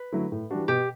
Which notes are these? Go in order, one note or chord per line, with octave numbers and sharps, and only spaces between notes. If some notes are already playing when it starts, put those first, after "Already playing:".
Already playing: B4
D3 F#3 A3 E4
A2
E3 G3 D4 F#4
B2 G4